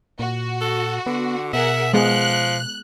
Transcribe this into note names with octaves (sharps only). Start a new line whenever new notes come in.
A#2 F#4
A4
D3 B3
B2 G#4 A#4 E5 F#5
F3 G#3 B3 G#4 F#6